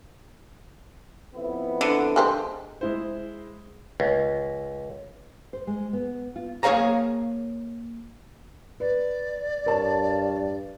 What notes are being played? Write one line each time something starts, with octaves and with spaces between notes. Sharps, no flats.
F2 B3 E4
D3
G#3 G4 C5
G#3 E4 C5
C#2
C5
G#3
B3
F4
A#3 G#4 C#5 F5 A#5
B4 D5
G2 A#4 C#5 A5